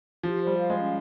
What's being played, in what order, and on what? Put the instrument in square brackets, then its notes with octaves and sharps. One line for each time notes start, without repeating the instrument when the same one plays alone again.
[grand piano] F3 [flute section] G4
[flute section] C5
[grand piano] G3
[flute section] F5
[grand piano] G#3
[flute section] C#4